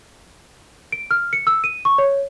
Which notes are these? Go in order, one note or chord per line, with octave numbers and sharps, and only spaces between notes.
D7
F6
C#7
E6
D#7
C#6
C#5